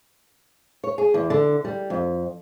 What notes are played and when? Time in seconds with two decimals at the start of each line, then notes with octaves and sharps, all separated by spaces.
0.84 C#5
0.98 G#4
1.14 E2
1.30 D3
1.64 G3
1.90 F2